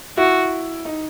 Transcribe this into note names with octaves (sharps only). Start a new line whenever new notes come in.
E4 F#4
D#4